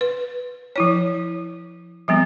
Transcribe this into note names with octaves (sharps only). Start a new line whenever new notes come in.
B4
F3 E4 C#5
F3 G3 B3 C4